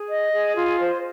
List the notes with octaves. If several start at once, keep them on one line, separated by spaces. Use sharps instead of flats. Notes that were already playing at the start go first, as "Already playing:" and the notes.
Already playing: G#4
D#5
G#4
F4
C5